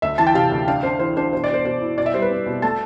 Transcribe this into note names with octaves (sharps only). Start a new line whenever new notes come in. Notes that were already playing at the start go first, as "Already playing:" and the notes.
D2 E5
E3 A5
G5
C3 F5
D2
D4 F5
D4 C5
E3 C5
D4 C5
B2 C5
D5
B2 C5
B2 C5
E4
B2 D5
E5
G3 C5
B4
C4
B2
A3 A5